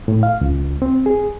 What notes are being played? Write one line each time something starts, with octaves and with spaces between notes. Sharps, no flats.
A2
F5
C#2
C4
G#4